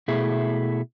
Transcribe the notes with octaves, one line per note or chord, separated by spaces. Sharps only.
B2 A3 E4 G#4